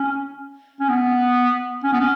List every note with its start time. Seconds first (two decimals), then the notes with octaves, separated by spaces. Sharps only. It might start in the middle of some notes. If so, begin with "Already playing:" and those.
Already playing: C#4
0.80 C#4
0.89 B3
1.84 C#4
1.93 B3
2.00 C#4